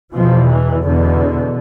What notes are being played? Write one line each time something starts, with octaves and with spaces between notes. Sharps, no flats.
E2 B2 F3
E3
E2 B2 D3